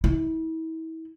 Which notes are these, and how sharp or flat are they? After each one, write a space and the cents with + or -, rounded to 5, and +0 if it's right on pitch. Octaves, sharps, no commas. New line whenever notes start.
E4 -35